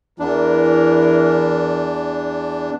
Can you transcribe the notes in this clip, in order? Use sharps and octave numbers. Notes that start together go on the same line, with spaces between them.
E2 E3 D4 A#4